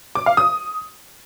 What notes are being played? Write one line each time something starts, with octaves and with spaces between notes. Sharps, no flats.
D6
F5
D#6